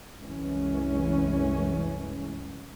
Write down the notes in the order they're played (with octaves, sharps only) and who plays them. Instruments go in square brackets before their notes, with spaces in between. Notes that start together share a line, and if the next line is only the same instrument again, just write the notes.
[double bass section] C2 F#2 E3 G#3 C#4